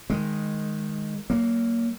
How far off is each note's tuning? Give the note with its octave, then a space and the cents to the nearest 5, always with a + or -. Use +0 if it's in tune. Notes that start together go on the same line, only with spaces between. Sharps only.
D#3 +0 G#3 +0
F#3 +35 A#3 +0